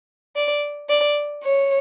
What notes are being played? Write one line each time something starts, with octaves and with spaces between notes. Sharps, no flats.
D5
D5
C#5